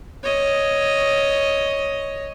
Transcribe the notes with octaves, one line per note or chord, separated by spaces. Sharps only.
C#5 D#5